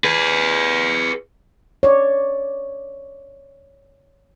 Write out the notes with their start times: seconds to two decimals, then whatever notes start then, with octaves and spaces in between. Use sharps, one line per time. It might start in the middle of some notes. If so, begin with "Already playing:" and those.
0.04 G#4 B4
1.83 C#5 D5